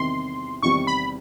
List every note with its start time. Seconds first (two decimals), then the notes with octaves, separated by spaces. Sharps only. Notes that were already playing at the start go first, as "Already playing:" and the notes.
Already playing: E2 C3 D#3 G3 C4 C6
0.63 E2 C3 D#3 G3 C4 C#6
0.87 B5